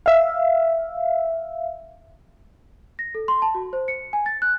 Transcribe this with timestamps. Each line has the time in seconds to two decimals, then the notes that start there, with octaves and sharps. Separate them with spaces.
0.06 E5 F5
2.99 A#6
3.15 A4
3.28 C6
3.42 A5
3.55 F#4
3.73 C5
3.88 C#7
4.13 G#5
4.26 A6
4.42 F#6